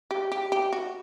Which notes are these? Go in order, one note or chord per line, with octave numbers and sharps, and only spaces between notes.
G4
G4
G4
F#4